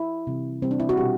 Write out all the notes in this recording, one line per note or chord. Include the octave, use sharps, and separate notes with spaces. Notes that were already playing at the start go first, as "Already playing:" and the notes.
Already playing: E4
C3 E3 G3
C3 E3 G3 C4
D4
E4
F#4
B2 G3 B3 G4